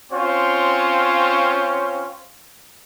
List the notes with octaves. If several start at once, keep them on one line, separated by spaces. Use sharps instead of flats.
C4 C#4 F4 C5 C#5